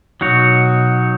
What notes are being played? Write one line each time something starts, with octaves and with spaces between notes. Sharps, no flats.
B2 F#3 D#4 F#4 C#5